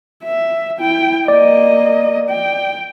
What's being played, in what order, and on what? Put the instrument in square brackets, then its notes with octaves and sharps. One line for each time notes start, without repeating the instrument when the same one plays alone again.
[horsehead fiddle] E5
E4 G5
[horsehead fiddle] A#3 D#5 [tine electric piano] D5
[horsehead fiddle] G5